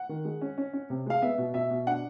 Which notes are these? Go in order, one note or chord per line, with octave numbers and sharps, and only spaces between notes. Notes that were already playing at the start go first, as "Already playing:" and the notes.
Already playing: F#5
D#3
G#3
C#4
C#4
C#4
C3
G#3 F5
B3 E5
B2
B2 E5
B2
D4 F#5